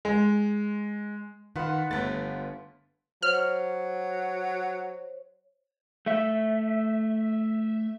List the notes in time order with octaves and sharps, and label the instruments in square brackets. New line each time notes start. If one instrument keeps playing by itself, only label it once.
[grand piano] G#3
[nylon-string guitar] D#3 [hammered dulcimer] F4 B4 F#5
[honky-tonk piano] G1 B3 A6 [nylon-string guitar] A3
[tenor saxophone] F#3 [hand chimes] C5 C#5 [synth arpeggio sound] F6
[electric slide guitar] A3 E5